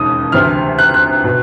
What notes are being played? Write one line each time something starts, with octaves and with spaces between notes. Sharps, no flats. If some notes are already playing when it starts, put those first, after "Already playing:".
Already playing: E1 D#2 C#3 D#6
D2 C3 E3 F6
F#6
F#6
B2